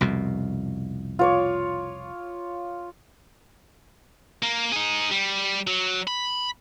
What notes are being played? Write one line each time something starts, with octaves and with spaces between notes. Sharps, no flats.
C2 F2 B2
F4 C#5 D6
A#3
D#4 G#4
G3
F#3
B5